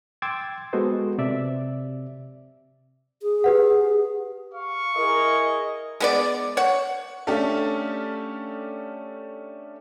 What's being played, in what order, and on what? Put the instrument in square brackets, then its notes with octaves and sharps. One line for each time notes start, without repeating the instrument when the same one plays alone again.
[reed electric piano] G5 C6 D6 E6 G#6 A6
G#3 B3 F#4 A4 C5 D#5
C3 D5 E5
[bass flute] G#4
[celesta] G4 B4 F#5
[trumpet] F5 [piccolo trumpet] C#6
[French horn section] E4 G#4 A#4 [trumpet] D#5
[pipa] G#3 B3 D5
C#5 F#5
[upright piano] A3 C#4 D4 G4 A4 F5